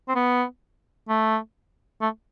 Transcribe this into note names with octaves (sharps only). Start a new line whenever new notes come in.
C4
B3
A3
A3